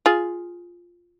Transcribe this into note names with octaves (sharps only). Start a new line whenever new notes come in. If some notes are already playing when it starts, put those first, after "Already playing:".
F4 G#4